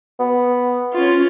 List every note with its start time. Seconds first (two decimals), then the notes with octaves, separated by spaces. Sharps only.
0.19 B3
0.93 C#4 F4